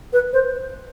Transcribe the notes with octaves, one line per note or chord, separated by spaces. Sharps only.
B4
C5